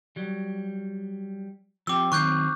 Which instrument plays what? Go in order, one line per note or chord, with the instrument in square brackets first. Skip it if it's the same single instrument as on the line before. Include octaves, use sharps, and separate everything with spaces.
[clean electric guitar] F#3 G3
[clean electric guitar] F3 C4 G4 [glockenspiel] D6 E6
[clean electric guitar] D#3 F#3 C4 [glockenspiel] C#6 F#6 G6